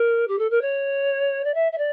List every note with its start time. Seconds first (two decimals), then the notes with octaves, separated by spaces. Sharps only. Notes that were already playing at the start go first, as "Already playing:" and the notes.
Already playing: A#4
0.27 G4
0.38 A4
0.50 A#4
0.61 C#5
1.44 D5
1.54 E5
1.72 E5
1.78 D5